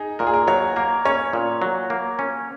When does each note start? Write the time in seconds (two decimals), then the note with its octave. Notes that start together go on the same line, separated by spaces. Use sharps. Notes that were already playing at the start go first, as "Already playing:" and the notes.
Already playing: D#4 G#4
0.19 A#2 A#4
0.27 G#4
0.34 A#4
0.48 F#3 C#5
0.76 A#3 A#4
1.05 C#4 C#5
1.33 A#2
1.62 F#3
1.90 A#3
2.19 C#4